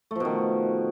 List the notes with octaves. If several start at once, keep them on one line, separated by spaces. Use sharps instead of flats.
B2 D#3 F3 A3